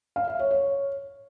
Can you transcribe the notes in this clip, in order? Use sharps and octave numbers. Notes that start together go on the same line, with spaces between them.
F5
E5
C#5
C#5